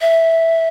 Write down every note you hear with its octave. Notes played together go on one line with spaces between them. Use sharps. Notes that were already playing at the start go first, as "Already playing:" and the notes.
E5